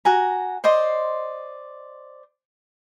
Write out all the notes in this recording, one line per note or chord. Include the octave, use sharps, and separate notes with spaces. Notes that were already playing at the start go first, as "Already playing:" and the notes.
F#4 G#5 A#5
C5 D5 D#5 C6